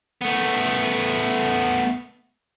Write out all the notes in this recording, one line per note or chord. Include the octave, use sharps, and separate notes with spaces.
A3 B3